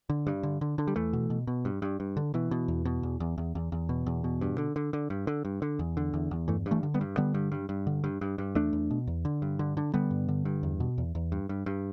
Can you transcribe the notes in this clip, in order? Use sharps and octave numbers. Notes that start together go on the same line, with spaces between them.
D3
G2
D3
D3
D3
G3
E2 E3 A3
B2
B2
B2
G2
G2
G2
D3
B2 E3
B2
E2
B2
E2
E2
E2
E2
E2
B2
E2
B2
G2
D3
D3
D3
G2
D3
G2
D3
E2
D3
E2
E2
G2 E3 A3
G2
E3 A3
D3
G3 B3
G2
D3 G3 B3
G2
G2
G2
D3
G2
G2
G2
E2 A3 D4
E2
B2
E2
D3
G2
D3
D3
D3 G3 B3
G2
D3
G2
E2
B2
E2
E2
G2
G2
G2